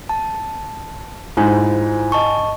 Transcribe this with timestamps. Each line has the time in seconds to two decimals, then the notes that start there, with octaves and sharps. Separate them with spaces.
0.09 A5
1.37 G#2 E4 F4 C5
2.12 D#5 A5 C#6